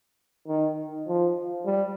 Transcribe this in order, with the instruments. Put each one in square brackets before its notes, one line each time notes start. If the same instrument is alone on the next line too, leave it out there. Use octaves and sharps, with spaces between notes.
[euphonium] D#3
F3
G3